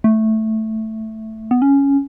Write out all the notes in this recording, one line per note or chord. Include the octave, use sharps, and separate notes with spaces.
A3
B3
C#4